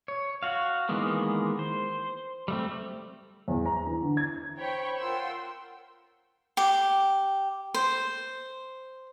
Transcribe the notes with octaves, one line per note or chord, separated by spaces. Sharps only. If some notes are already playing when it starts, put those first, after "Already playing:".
C#5
F#4 F5
D#3 E3 G#3 A#3 B3
C5
G3 A3 C4
E2
A#5
E3
D3
G#6
C5 C#5 G5 B5 C#6
F4 A#4 F#5 G5 C6 E6
G4
C5